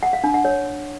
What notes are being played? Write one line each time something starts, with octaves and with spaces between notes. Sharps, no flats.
F#5
F5
D4
F#5
C#5